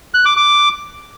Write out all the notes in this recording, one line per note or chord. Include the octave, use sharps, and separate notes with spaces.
F#6
D6
D6